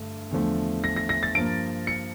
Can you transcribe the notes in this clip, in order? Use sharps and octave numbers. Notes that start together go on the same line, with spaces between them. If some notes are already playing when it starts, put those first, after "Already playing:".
Already playing: G2 D3 A3
E2 D3 F3 A3
A#6
A#6
A#6
A6
G2 F3 A#3 D7
C#7